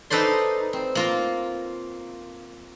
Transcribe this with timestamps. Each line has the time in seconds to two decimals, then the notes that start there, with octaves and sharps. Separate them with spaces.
0.10 D#4 A4 B4 C5 D5 C6
0.73 C4
0.95 A#3 F4 A#4